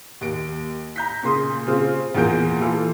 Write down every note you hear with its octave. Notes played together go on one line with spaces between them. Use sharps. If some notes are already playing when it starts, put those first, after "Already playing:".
D#2 D7
A#5 G6 B6
A#2 C#3 C6 D#6
C#3 C4 F4
E2 A#2 A#3 F4 G6 D7
E3 F4 A4